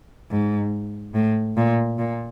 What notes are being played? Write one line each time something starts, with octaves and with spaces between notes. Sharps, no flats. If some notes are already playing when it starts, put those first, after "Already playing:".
G#2
A2
A#2
A#2